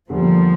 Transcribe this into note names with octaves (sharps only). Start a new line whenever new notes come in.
E2 D3 F3 G3 A#3